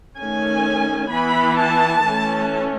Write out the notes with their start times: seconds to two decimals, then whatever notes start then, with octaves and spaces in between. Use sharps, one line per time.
0.18 D#3 A3 C#4 G#5
1.11 E3 B3 B5
1.58 A5
2.05 E3 A3 C#4